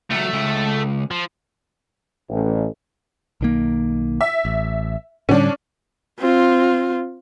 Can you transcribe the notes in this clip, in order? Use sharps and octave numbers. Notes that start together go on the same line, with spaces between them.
C#2 F#3 A3
C#2
F3
A1
B1 D#3 A#3
E5
A1
A2 D3 G3 C#4 D4
C4 F4